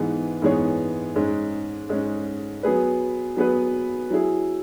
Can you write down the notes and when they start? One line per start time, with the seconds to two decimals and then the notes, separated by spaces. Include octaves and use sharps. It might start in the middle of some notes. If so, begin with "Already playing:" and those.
Already playing: G#2 E3 B3 G#4
0.42 G#2 E3 B3 G#4 C#5
1.16 G#2 G#3 C#4
1.89 G#2 G#3 C#4
2.63 F#3 B3 G#4 B4
3.37 F#3 B3 G#4 B4
4.10 F#3 E4 G#4